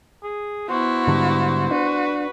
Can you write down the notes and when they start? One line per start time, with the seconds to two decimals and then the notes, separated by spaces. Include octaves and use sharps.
0.24 G#4
0.69 B3 E4 F#4 C5
1.07 G#2 D3 G3
1.71 D4 F#4 B4